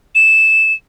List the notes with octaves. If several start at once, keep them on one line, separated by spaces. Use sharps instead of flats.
E7